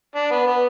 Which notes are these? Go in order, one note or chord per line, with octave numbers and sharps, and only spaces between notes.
D4
B3
B3